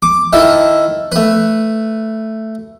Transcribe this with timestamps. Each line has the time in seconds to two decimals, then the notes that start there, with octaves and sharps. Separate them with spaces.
0.02 D6
0.33 D#3 E4 A4
1.12 A3 B4